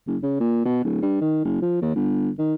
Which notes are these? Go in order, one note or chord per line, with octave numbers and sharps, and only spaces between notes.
F#1
C#3
A#2
B2
D1
G2
D#3
F#1
F3
D#2
G1
D#3